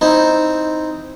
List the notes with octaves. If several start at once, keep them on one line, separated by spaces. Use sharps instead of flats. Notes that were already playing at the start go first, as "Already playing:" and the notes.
C4 D#4 E4